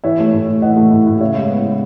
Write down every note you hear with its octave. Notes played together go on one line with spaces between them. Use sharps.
E3 C#5 E5
A3
A2
A2
E3 D#5 F#5
A3
A2
A2
C#3 C#5 E5
G#3
B3